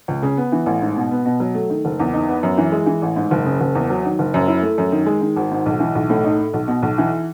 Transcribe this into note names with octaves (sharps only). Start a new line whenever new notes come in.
C#2
C#3
B3
E3
A1
G#2
B2
B3
B2
F#3
A3
D#3
F#1
E2
D#4
B3
F#2
E3
G#3
E3
A1
G#2
F#1
C#3
F#1
E2
F#3
D#3
F#1
F#2
E4
A3
F#2
D#3
G#3
D#3
G#1
G#2
B1
E3
B1
A2
D#4
A3
B1
B2
B1
E3